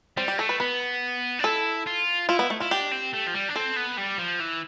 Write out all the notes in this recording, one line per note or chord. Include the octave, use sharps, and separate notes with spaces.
G3 C4
G4
A3 A4
B4
B3 B4
D4
E4 A4
F4
E4 F4
B3
A3
E4 F4
D4 G4
C4
A3
F3
G3
D4
C4 A4
B3
G3
F3
E3